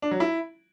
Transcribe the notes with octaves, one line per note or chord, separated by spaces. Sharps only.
D4
F#3
E4